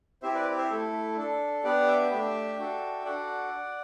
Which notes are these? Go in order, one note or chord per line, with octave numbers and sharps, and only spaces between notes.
C4 E4 G4 C5 E5
B4 D5
C5 E5
A3 E4 A4
D4 A4
B3 D4 G4 D5 F#5
E5 G5
A3 D4 G4
D4 F#4 A4
D4 F#4 A4 D5 F#5